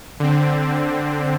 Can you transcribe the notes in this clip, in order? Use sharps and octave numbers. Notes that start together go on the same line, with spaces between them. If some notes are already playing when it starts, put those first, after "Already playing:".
D3 C4